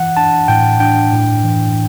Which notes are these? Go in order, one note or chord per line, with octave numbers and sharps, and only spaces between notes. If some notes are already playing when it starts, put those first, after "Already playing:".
Already playing: E3 F#5
D4 A5
A2 G5
D4 G5
A2
E3